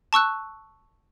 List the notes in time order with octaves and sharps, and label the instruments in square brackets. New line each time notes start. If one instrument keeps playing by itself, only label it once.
[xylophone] A5 C#6 E6 F#6